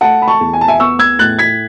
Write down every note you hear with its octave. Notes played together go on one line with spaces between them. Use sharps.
A3 F#5 A5
B5
A5 C#6
E2
G#5
A5
E5 G#5
B3 C#6 E6
E6 G#6
A2 F#6 A6
G#6 B6